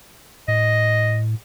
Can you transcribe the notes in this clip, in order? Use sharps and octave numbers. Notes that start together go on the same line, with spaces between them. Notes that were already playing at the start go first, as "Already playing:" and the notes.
A2 D#5